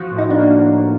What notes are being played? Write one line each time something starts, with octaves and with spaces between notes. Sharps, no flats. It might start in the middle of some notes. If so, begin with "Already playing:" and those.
Already playing: F3 F#4
A2
D#4
A#3 D4